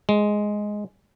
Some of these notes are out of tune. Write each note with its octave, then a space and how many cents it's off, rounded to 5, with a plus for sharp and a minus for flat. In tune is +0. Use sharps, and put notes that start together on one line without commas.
G#3 +5